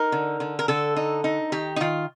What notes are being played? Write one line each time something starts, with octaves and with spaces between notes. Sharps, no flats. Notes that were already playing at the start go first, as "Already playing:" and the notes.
Already playing: D#4 A#4
D3
D3
A#4
D3 A4
D#4
D#4
D#3 G4
D#4
D#3 F4